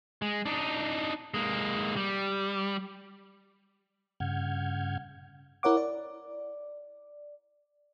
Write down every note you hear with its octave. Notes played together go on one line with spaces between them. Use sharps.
G#3
D4 D#4
G#3 A#3
G3
G2 C#3 F#5 F6 G6 G#6
E4 A#4 C#5 F#5 D6
D5